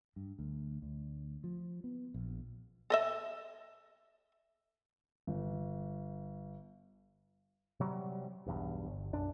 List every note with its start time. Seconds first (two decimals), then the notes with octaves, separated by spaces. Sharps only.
0.16 G2
0.39 D2
0.82 D2
1.44 F3
1.84 B3
2.14 A#1
2.90 A4 D#5 E5
5.27 G1
7.80 C3 F#3 G3
8.46 B1 E2 G2
8.86 G1
9.13 B1 F#2 D4